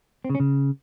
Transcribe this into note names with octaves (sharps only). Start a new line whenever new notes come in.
C4
C#3
C#4
C#3